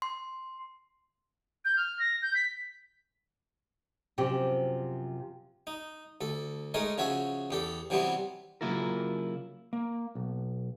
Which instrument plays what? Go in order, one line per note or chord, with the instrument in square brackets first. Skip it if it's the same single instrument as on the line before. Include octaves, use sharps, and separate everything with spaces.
[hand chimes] C6
[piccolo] G6
F6
A#6
G6
B6
[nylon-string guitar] F#2 C3 F3 G4
[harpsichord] D#4
D2 A4
G#3 A3 D#4 A#4 C#5 D#5
C#3 F3 F#4 C#5 E5
E2 G4 A4
C3 E3 F#3 G3 B3 C4
[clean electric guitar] C#3 F#3 A#3 E4 F4 A#4
A#3
B1